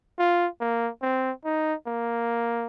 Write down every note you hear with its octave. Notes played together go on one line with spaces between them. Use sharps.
F4
A#3
C4
D#4
A#3